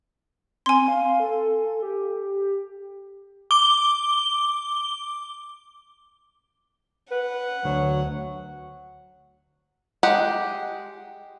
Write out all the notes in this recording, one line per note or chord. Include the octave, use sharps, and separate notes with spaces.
C4 G#5 C6
F5
A4
G4
D6 G7
B4 F#5
D2 F#3
G#3 G4 F#5